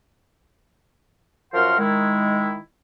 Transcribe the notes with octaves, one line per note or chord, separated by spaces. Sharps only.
F#2 F3 A#4 F#5 C6 F6
D#3 G#3 E4